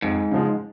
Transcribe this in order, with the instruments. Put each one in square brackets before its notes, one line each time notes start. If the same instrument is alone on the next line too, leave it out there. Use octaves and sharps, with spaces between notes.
[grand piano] F2 [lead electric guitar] G#2
[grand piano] C#3 F3 G#3